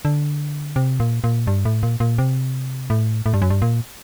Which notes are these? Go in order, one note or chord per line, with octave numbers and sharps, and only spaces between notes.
D3
C3
A#2
A#2
G2
A2
A#2
A#2
C3
A2
A2
G2
F#2
G2
A#2